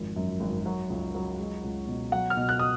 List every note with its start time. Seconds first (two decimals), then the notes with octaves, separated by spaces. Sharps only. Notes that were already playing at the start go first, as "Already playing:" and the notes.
Already playing: G#1 F2
0.16 F#2
0.40 G#1
0.66 F#3
0.90 C#2
1.15 F#3
1.39 G#3
1.64 C#2
1.87 B2
2.12 F#3 F#5
2.30 F6
2.37 B2
2.49 F#6
2.59 D#6